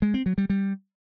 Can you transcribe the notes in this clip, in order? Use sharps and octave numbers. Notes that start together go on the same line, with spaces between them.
G#3
C4
F#3
G3
G3